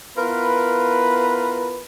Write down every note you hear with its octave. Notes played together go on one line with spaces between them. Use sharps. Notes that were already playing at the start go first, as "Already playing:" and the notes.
B3 E4 F4 A#4 B4